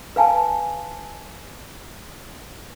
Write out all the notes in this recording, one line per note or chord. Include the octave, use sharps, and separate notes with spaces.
B4 F5 G#5 A5